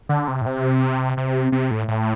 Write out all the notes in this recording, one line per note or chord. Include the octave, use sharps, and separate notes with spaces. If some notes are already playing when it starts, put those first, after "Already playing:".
D3
C3
A2
C3
C3
C3
A2
A2